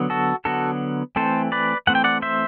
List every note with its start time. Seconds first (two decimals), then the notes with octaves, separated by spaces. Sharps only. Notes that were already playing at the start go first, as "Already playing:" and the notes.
Already playing: D3 F#3 B3
0.10 F#4 A4
0.45 D3 F#3 B3 F#4 A4
1.16 E3 A3 C4 A4 C5
1.52 B4 D5
1.87 E3 A3 C4 F#5
1.95 G5
2.04 D5 F#5
2.22 C5 E5